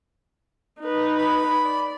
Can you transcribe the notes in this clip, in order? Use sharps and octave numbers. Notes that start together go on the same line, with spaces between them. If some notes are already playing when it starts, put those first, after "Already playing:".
D#4 B4
B5
D5